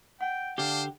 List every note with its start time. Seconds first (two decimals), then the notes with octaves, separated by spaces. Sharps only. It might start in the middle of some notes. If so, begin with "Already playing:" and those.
0.21 F#5 G5
0.58 D3 D4 G4 C5 F5